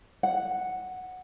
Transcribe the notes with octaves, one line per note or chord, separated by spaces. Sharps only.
F#5